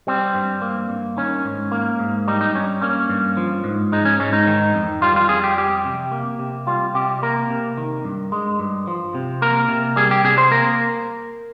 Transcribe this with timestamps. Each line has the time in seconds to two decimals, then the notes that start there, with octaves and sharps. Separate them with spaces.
0.07 G3 C4
0.34 G2
0.62 A#3
0.90 G2
1.17 D#3 C#4
1.45 G#2
1.72 A#3
1.99 G#2
2.28 G3 D#4
2.41 D#4
2.55 G2 C#4
2.82 A#3 C#4
3.09 G2
3.37 F3
3.64 G#2
3.92 G#3 D#4
4.05 C#4
4.20 G#2 C#4
4.33 D#4
4.47 D#3
4.74 F2
5.02 G3 F4
5.16 F4
5.29 F2 G#4
5.44 G4
5.57 G3 G4
5.85 C3
6.12 A#3
6.39 C3
6.67 G3 F4
6.94 C3 G4
7.22 A#3 A#4
7.50 C3
7.78 D#3
8.04 G2
8.32 G#3
8.59 G2
8.87 F3
9.15 C3
9.42 A#3 A#4
9.69 C3
9.96 G3 G#4
10.11 G4
10.24 C3 G#4
10.38 C5
10.51 A#3 A#4